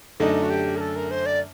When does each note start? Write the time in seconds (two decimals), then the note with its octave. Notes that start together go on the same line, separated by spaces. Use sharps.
0.20 F#2 D3 A3 D4 D#4
0.43 F#4
0.50 G4
0.77 A#4
0.80 A4
0.96 A#4
1.11 C5
1.26 D5